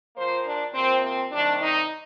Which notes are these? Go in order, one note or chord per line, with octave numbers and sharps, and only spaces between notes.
A#2 F3 A#3 C5
D4
C3 F3 A#3 C4
C4
C3 D#3 G3 D4
D#4